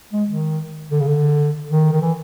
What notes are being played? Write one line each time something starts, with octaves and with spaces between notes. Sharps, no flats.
G#3
D#3
D3
C#3
D3
D#3
D#3
E3